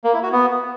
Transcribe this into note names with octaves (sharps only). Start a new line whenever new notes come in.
A#3
E4
F#4
B3